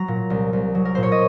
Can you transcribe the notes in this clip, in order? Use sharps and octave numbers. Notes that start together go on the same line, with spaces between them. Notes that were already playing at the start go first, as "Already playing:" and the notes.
Already playing: F#3 A#5
A#2
C2
C2
F#3
A#4
A#2 C5
C#5
D#5